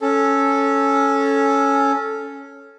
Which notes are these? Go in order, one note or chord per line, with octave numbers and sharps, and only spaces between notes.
C#4 A4